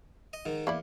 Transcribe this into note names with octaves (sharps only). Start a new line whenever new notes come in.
D#5
G#2 D#3
E2 A#3 E4 D5